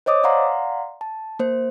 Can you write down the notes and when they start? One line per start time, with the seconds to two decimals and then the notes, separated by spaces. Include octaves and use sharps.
0.06 C5 C#5 D#5 D6 D#6
0.24 D5 F5 F#5 A#5 C6
1.01 A5
1.39 A#3 C5